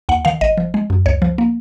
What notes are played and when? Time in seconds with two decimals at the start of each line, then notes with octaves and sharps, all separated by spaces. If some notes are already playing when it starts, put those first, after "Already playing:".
0.09 D#2 F#5
0.25 D#3 F5
0.41 G#1 D#5
0.58 F3
0.74 G#3
0.90 F#2
1.06 C#2 C#5
1.22 F3
1.38 A#3